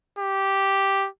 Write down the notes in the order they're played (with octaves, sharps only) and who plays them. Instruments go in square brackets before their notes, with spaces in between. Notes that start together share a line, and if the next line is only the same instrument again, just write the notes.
[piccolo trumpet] G4